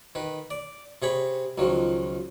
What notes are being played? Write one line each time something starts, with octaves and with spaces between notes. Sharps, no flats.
D#3 B4
D5
C3 G#4 C#5 B5
C#2 D#3 F3 F#3